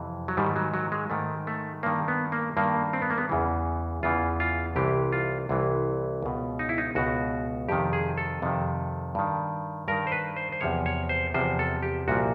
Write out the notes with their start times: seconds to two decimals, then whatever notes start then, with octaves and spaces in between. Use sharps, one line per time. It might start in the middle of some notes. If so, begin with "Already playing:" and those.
Already playing: F2 C3 E3
0.28 F#3
0.37 G#2 D#3 G3
0.56 F#3
0.74 F#3
0.92 G#3
1.10 G#2 D#3 A3
1.47 A3
1.83 G2 D#3 A#3
2.08 B3
2.32 A#3
2.57 G2 D#3 A#3
2.93 C4
3.02 B3
3.10 A#3
3.18 B3
3.29 E2 C#3 E3
4.03 E2 C#3 E3 F4
4.40 F4
4.76 C2 C3 E3 G4
5.12 F4
5.49 C2 C3 E3
6.23 C#2 B2
6.59 D#4
6.69 E4
6.78 D#4
6.95 C#2 B2 F#4
7.69 F2 C3 D#3 G4
7.93 G#4
8.18 A4
8.42 F2 C3 D#3
9.15 G2 D#3
9.88 G2 D#3 A#4
10.07 C5
10.12 B4
10.36 C5
10.52 C5
10.61 E2 C3 F3 C#5
10.86 C#5
11.09 C5
11.34 E2 C3 F3 C5
11.59 A4
11.83 G4
12.08 C2 A#2 F3 F#4